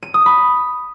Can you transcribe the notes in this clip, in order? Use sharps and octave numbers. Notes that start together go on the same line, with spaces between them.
D#7
D#6
B5